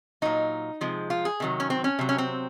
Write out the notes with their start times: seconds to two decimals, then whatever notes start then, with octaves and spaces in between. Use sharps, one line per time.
0.22 A#2 F#3 D#4
0.81 C3 F3 G#3
1.10 F4
1.25 G#4
1.40 C3 D#3 F#3
1.60 C#4
1.70 C4
1.84 C#4
1.99 C3 F#3
2.09 C#4
2.18 C4